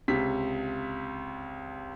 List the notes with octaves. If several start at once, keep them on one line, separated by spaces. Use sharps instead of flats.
C#2 C3 B6